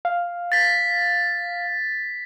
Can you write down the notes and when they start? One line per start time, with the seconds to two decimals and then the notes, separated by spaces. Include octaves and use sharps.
0.05 F5
0.52 A6 B6